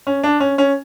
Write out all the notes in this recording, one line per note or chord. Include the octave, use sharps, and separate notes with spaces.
C#4
D4
C#4
C#4